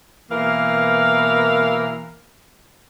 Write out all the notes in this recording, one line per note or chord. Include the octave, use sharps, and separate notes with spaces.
B2 E3 A#3 A#4 F5